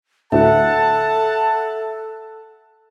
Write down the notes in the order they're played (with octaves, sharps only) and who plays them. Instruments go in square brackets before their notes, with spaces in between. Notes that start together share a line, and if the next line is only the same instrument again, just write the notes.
[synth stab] D2 A2 [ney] A4 [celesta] E5 [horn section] F#5 A5